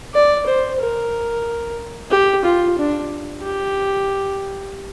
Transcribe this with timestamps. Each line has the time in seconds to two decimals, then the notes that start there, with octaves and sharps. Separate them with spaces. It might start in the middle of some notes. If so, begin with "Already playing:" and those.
0.14 D5
0.47 C5
0.81 A#4
2.11 G4
2.45 F4
2.78 D4
3.43 G4